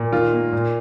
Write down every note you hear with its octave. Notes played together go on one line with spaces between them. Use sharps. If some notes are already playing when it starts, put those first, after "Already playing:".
Already playing: A#2
D#3 F4
A#3
A#2